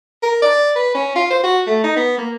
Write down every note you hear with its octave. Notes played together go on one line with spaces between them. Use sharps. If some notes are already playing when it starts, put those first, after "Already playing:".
A#4
D5
B4
C#4
F4
C5
F#4
A3
D#4
B3
A#3